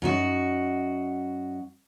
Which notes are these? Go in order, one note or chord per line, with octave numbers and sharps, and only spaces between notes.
F#2 D#4 F#4